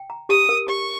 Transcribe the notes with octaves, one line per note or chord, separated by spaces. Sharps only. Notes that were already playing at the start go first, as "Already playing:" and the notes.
Already playing: G5
A#5
G4 D#6
A#4
G4 C#6